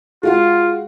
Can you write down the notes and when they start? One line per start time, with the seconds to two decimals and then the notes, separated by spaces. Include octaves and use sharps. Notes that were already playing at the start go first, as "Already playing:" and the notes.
0.23 G#3 F4 F#4 F5